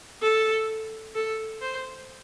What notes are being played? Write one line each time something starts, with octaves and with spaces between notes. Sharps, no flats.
A4
A4
C5